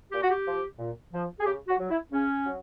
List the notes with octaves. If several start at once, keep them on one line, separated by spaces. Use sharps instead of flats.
A#2 G4
F#4
G4
F3
A#2
F3
G#4
C#3 G4
F#4
F#3
E4
C#3 C#4
F#3